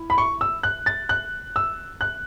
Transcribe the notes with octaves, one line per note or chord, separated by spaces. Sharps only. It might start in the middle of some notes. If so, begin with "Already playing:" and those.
Already playing: E4
B5
C#6
E6
F#6
A6
F#6
E6
F#6